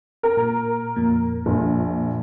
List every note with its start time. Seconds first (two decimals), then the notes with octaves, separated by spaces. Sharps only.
0.23 A#4
0.37 A#2
0.96 F2 A#2
1.46 A#1